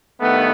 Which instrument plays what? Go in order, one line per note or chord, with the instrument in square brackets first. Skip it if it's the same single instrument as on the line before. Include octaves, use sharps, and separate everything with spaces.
[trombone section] G2 D#3 A3 B3